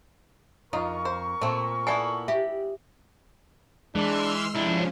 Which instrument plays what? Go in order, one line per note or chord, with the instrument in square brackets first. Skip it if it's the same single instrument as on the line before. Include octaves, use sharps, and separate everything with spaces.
[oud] F2 F4 [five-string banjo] D#4 [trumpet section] A#4 C#6
[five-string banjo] C5
[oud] A#2 [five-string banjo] A3 C4
[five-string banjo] B3 E4 A4 [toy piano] D5 F#5 G#5
[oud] G4 [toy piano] E5
[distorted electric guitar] E3 [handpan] G#3 [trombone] D4 [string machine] C6 E6 F6
[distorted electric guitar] C3 D4 [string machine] F3 C#4 [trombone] E4